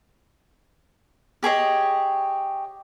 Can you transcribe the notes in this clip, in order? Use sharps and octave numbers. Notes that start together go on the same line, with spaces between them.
G4 G#4 C#5 D#5